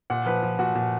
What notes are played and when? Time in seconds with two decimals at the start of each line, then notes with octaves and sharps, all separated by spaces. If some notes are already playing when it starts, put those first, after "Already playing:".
0.10 A#2 F#5
0.26 F3 B4
0.42 F3
0.59 A#2 F#4
0.75 A#2